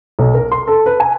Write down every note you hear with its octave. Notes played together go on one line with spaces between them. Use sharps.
B1
A#4
C6
A4
B4
G#5